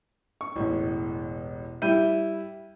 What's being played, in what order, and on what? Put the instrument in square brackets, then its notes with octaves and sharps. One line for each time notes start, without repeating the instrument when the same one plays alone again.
[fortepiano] C#6
[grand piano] E1 A1
[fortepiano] G3 E4 [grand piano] G6 D#7